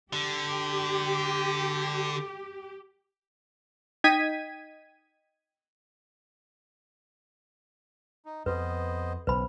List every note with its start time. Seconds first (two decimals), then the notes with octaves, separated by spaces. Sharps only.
0.13 D3 G4
4.04 D#4 D#5 G5 G#6 B6 D#7
8.25 D#4
8.46 F2 B3 B4 C5 D#5
9.27 B1 C#3 B4 C5 B5